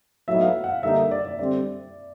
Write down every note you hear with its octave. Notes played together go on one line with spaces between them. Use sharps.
A2 F#3 B3 D#4 E5
F5
F#5
F5
D3 G3 A#3 D#4 E5
D5
D5
D3 G3 C4 D5